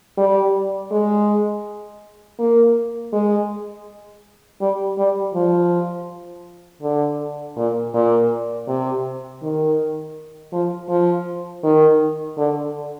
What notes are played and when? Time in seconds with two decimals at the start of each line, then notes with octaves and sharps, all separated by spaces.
0.18 G3
0.91 G#3
2.39 A#3
3.12 G#3
4.61 G3
4.98 G3
5.35 F3
6.82 D3
7.56 A#2
7.94 A#2
8.68 C3
9.42 D#3
10.52 F3
10.89 F3
11.64 D#3
12.38 D3